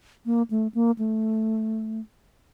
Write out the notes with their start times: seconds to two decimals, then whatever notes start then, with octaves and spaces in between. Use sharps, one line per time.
0.26 A#3
0.50 A3
0.74 A#3
0.98 A3